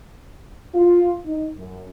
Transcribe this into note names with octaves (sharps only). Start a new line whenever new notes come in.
F4
D#4
F#2